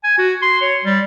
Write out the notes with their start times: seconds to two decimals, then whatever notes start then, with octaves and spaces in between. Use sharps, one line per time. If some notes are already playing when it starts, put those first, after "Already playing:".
0.04 G#5
0.18 F#4
0.42 C6
0.62 C#5
0.84 G3